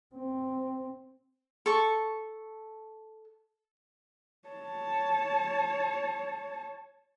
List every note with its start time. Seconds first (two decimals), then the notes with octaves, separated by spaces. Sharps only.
0.15 C4
1.66 A4 C#6
4.49 C#5 A5